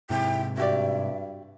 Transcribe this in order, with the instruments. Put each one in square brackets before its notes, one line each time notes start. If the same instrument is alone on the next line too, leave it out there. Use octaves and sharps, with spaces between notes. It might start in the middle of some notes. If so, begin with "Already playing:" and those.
[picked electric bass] G#2 C3 [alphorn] E4 [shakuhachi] G5
[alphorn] G2 [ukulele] F#4 G4 D5 [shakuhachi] E5